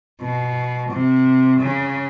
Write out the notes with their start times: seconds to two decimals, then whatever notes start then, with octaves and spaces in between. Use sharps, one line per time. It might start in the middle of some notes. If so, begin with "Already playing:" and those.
0.21 B2
0.90 C3
1.60 C#3